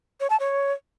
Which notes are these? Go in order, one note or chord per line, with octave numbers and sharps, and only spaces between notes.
C#5
A5
C#5